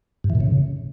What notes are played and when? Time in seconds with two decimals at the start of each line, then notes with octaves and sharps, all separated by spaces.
0.24 G2
0.30 E3
0.35 A#2
0.40 C#3